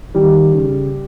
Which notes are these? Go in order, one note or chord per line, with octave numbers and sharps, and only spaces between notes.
D#3 G3
C#3